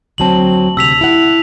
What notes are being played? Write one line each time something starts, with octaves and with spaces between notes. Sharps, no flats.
D2 F#3 C4 A5 F#7
D2 C3 E6 B6 F7
E4 F#5